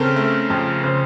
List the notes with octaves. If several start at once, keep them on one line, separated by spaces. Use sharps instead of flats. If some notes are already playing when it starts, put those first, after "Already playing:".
Already playing: C#3 C4 A4 A#4
A3
F2
C#3 C5